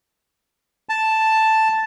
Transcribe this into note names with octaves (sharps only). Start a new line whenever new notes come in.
A5